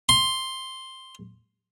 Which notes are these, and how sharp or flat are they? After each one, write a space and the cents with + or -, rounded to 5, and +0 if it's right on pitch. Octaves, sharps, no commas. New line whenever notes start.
C6 +5